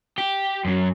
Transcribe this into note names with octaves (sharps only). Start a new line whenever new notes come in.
G4
F#2 F#3